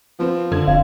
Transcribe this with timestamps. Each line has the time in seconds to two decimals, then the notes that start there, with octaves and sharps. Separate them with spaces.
0.19 F3 B3 C4
0.52 F2 D3 G#6
0.67 D#1 F2 F5